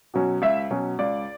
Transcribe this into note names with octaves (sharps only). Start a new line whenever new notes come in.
B2 F#3 C#4
C#2 E5
B2 F#3 C#4
C#2 D5